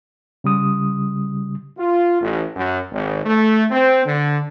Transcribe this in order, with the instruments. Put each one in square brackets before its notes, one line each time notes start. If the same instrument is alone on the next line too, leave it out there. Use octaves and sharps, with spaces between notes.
[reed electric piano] C#3 G3 D#6
[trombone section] F4
A1
F#2
G#1
A3
C4
D3